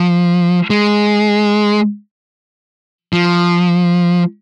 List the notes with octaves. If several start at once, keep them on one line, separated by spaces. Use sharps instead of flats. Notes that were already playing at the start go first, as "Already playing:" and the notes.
Already playing: F3
G#3
F3